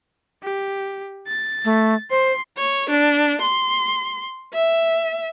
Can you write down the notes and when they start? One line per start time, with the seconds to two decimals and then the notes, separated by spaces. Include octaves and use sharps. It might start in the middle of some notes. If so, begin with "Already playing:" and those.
0.43 G4
1.27 A6
1.65 A3
2.11 C5 C6
2.58 C#5
2.90 D4
3.42 C6
4.54 E5